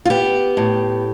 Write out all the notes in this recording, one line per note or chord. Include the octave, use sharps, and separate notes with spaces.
F4
B3 G4
A2